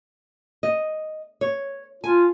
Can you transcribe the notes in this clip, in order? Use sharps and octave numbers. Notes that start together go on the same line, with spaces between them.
D#5
C#5
F4 G#5